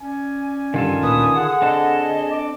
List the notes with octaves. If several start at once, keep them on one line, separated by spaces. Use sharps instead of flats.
C#4 D5 G#5
G2 D3 D#3 F4 A4
D2 A#2 B4 D#6
D3 G#4 F#5
C4 D4 A4 D#5
D6